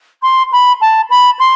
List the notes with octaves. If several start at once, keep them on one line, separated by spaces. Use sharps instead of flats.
C6
B5
A5
B5
C6